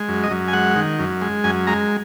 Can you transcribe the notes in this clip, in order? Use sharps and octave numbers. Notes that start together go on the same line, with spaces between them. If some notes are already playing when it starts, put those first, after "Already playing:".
Already playing: G#3
F#2
D#5
F#2
G#5
G#3 F#5
D#3
F#2
G#3
F#2 G#5
G#3 A#5